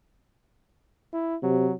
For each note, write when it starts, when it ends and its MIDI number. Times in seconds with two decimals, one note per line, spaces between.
1.13 1.36 64
1.43 1.70 48
1.43 1.74 54